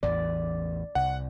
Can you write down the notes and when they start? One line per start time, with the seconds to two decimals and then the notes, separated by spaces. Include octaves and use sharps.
0.03 A1 E2 E3 D5
0.95 C2 F#5